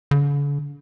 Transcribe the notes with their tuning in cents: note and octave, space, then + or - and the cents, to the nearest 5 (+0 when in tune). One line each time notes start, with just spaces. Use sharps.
D3 -45